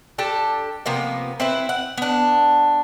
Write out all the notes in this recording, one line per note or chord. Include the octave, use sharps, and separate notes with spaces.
D4 G4 A4
C3 F3 A#3 B3
C4 E4 B4
F#5
B3 D4